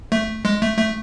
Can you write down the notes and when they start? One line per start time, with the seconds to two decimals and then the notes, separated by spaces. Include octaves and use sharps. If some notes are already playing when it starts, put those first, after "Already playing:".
0.12 A3
0.45 G#3
0.62 A3
0.78 A3